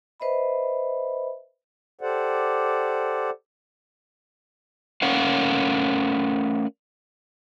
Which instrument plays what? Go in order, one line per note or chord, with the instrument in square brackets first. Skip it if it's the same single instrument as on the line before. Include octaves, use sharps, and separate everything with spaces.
[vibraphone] B4 C5 D#5 E5 B5
[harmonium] G4 A4 C5 D5 F#5
[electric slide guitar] A3 C#4 A#4 F5 F#5